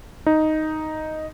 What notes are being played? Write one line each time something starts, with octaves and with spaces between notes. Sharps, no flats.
D#4